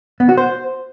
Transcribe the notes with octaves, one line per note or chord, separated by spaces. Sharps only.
B3
F#4
C5